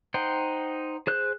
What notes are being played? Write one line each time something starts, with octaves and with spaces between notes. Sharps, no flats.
D#4 C5 F#5 G5
G#4 C5 F#6 G6